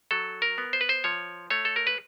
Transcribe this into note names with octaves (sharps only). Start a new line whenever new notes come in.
F#3 A4
A#4
B3
C5
B4
C5
F3 C#5
A3 C#5
A4
A#4
B4